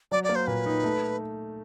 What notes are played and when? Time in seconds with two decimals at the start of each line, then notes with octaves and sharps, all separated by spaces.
0.12 F#3 D5
0.24 D5
0.29 A#3
0.35 C5
0.47 A#2 B4
0.66 D#4
0.84 A3